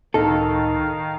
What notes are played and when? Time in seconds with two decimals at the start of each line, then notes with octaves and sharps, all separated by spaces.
0.14 C#2 A2 D#3 D#4 A4 F5